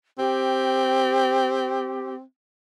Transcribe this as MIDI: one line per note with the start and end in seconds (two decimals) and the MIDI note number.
0.18 2.21 60
0.18 2.14 67